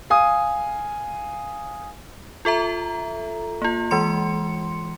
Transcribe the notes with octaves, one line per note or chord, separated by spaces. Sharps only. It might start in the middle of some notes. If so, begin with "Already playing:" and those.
F5 G#5 D#6
F4 A4 E5 A#5
A#3 F4
E3 G#3 C6 C#7